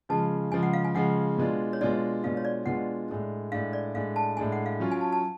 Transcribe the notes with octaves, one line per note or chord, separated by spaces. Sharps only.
C#3 F3 G#3 A5
C#3 F3 G#3 G#5
F#5
F5
G#5
C#3 F3 G#3 F#5
B2 G#3 D4 F4
C#5
B2 G#3 D4 F4 D5
B2 G#3 D4 F4 F5
C#5
D5
B2 G#3 D4 F4 F#5
A2 G#3 D4
A2 G#3 D4 F5
D5
A2 G#3 D4 F5
A5
A2 G#3 D4 G#5
F#5
F5
F#3 C#4 F4
G#5
A5
A5